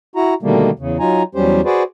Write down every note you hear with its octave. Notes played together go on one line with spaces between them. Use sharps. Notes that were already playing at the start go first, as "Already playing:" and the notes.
E4 F#4 A#5
B2 D3 D#3 G3 A3 A#3
E2 C#3
F#3 D#4 F4 G#5 A#5
E2 F#3 G3 C#4 G4 C5
F#4 G#4 B4 C5 D5